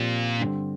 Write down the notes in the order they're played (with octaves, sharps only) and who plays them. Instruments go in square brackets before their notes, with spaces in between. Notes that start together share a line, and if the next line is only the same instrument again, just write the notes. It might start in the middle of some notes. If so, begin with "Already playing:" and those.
Already playing: [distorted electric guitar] A#2 [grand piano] F3 C4 G4
[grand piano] G2 D3 G3 C4